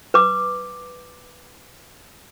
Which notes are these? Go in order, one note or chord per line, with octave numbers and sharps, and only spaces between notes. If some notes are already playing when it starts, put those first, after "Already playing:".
B4 D6